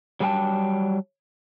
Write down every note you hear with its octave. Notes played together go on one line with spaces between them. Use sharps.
F#3 G3 G#4 B4 G5 A5